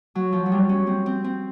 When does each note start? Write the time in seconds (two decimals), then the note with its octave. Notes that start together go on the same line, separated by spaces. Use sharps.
0.15 F#3
0.32 F3
0.46 F#3
0.52 G3
0.69 C#4
0.87 C4
1.06 C4
1.24 C4